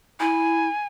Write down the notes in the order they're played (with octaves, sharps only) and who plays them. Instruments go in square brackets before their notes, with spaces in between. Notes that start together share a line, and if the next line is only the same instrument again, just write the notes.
[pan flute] E4 [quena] G#5